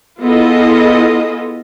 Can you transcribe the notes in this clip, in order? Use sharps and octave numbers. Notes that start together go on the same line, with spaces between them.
B3 E4 F4 G#4 A4 D#5